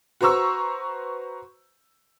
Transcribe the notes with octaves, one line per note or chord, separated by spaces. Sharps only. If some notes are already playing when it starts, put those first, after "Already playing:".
F#4 B4 C5 A#5 C#6 E6